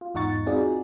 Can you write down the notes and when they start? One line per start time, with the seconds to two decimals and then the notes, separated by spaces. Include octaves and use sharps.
0.01 F4
0.14 E2 G#2 D#4 F#5 C#6 A6
0.46 C4 D#4 F4 F#4 G#4 D5